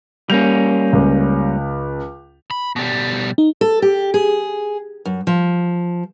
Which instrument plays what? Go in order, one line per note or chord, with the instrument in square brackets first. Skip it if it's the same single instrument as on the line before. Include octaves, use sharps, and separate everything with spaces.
[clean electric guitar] G3 A#3 C#4 [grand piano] G6 F7
[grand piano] C#2
[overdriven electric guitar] B5
B2 G3
[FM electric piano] D#4
[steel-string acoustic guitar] A4
G4
G#4
F#2
F3